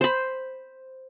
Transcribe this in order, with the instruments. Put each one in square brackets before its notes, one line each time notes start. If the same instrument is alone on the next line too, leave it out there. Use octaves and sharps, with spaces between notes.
[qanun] C5 B5